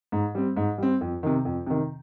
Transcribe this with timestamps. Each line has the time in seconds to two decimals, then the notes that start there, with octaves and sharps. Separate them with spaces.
0.12 G#2
0.35 G3 C4
0.57 G#2
0.78 G3 C4
1.01 F2
1.23 C3 D#3
1.45 F2
1.66 C3 D#3